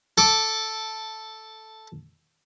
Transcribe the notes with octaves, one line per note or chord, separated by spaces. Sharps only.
A4 D6